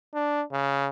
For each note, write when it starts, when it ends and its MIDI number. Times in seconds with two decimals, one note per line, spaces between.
0.14 0.42 62
0.52 0.89 49